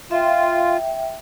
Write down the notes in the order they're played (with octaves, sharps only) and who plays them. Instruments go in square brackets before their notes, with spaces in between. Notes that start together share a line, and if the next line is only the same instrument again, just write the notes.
[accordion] F4 [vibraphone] E5 G5